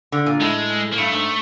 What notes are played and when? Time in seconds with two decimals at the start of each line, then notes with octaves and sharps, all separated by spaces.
0.12 D3
0.26 A#2
0.41 A2 G#3
0.93 A#3
0.98 G2 A3
1.13 G#2